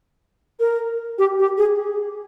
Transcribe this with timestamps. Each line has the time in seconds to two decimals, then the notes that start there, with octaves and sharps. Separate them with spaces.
0.60 A#4
1.18 G4
1.39 G4
1.58 G#4